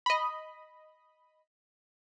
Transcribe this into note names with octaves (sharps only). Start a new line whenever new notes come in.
D#5 B5